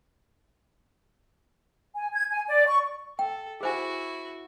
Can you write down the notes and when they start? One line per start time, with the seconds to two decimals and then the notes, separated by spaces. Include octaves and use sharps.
1.95 G#5
2.13 G#6
2.31 G#5
2.48 D5
2.68 C#6
3.19 A4 G5
3.61 E4 F#4 G#4 C5 G#5